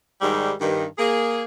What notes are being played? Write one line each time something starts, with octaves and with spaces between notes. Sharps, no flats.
G#2 D#3 G3
G2 D#3
A#3 G#4